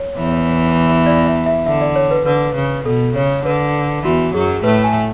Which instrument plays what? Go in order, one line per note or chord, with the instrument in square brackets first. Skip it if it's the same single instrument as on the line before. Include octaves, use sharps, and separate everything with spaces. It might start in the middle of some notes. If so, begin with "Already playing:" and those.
Already playing: [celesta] C#5
[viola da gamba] E2 E3
[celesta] D5
E5
E5
[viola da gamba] D3 [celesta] E5
[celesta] D5
C#5
B4
[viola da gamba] D3 [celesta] B4
[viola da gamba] C#3
[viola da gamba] B2 [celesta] A4
[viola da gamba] C#3 [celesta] C#5
[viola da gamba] D3 [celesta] B4
[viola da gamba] E2 E3 [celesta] F#4
[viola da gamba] F#2 F#3 [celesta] G#4
[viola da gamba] A2 A3 [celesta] B4
[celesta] G#5